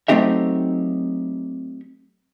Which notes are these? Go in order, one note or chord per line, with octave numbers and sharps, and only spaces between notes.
F#3 A3 C4 D#4 G4 E5